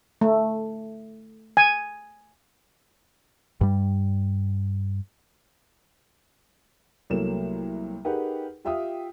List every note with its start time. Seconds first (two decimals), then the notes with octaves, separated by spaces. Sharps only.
0.21 A3
1.57 G#5
3.61 G2 G3
7.10 C2 F#3 A3 A#3 E7
8.05 D#4 G4 G#4 A#4 B4 F#5
8.65 F4 G4 E5 F5 G5 D#6